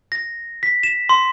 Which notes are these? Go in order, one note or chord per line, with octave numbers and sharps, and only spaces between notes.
A#6
B6
E7
C6